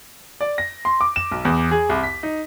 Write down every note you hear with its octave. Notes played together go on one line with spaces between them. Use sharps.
D5
A#6
C6
D6
E7
B1
E2
G#4
C2
B6
D#4